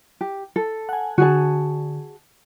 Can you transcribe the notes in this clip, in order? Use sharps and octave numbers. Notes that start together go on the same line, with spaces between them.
G4
A4
F#5 G#5
D3 F#4 G#4 A5